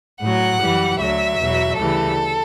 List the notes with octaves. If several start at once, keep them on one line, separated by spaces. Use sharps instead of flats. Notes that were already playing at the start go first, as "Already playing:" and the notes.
A2 F#3 F#5
F#2 E3 G3
D2 D3 F#3 E5
E2 B2 F#3
D2 C#3 E3 G3 A4